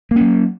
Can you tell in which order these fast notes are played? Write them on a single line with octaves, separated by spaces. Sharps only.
A#3 C#4 F#3